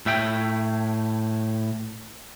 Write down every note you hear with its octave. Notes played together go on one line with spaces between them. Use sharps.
A2 E5 G5